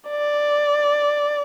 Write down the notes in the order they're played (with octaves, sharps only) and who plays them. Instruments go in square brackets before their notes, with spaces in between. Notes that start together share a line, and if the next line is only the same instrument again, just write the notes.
[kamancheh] D5